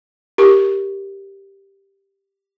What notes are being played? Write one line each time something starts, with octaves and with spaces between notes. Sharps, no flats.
G4 A#4 C#6